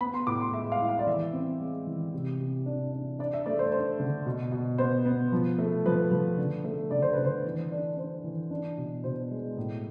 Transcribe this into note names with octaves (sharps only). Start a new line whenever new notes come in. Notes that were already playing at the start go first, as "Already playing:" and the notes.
B3 B5
C6
A2 D6
C6
G#3 E5
F5
E4
F5
D5
E3 E5
C4
G#3
E3
C3
C3
D4
D4
D4 D5
E5
A3 D5
C5
D4 C5
D3
B2
B2
B3 C5
B3
F3
A3
F3 B4
F3
D3
A3
D3 D5
C5
D3 B4
C5
E3
D4
D4 C5
E3
D4
B2
B2 C5
G#3
A2